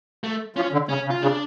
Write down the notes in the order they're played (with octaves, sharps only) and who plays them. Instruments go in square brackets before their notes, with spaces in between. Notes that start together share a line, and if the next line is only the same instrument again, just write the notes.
[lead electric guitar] A3
[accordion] F3 [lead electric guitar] C#4
[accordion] D3
[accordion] C#3 [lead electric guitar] C#4
[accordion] C#3
[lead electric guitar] F4
[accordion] C#3 [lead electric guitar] D4